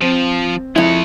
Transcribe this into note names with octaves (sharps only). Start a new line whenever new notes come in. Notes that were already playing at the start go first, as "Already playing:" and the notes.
F3 C4
F2 G#3 E4 C#5